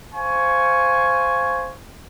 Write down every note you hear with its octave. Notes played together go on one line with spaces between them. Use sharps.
C5 F5 G#5 C#6